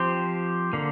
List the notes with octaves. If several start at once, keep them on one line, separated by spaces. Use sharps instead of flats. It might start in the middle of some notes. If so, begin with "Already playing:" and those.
Already playing: F3 C4 G4 C5
D3 A#3